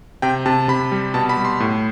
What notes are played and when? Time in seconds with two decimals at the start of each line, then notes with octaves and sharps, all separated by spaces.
0.22 C3 G5
0.46 C3 A5
0.68 C3 B5
0.92 G3
1.14 B2 A5
1.29 B5
1.37 G3
1.45 C6
1.60 A2